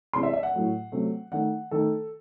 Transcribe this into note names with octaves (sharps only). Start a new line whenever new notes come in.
C3 E3 G#3 C6
E5
E5
F#5
A2 F#3 A3
C3 F#3 A3
D#3 A3 F#5
D#3 A3 A4